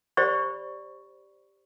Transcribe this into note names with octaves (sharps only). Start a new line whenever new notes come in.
G4 C5 D5 D#5 B5 C#6